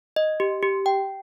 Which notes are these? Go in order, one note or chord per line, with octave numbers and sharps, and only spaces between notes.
D#5
G4
G4
G5